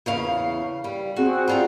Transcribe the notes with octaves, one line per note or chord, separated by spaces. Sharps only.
E2 C#3 F5
G3
C4 F#4 G#4 F#5
G3 F4 A#5